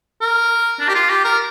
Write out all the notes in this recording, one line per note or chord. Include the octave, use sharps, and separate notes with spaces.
A#4
D4
G4
F4
G4
A#4